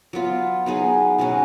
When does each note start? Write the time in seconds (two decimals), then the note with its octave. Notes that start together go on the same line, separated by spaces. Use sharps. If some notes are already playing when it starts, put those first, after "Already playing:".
0.13 F#3 B3 F4
0.66 F#3 B3 D#4 G#4
1.18 B2 G#3 C#4 F#4